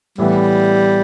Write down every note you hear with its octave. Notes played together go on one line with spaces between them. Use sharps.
A2 E3 G3 B3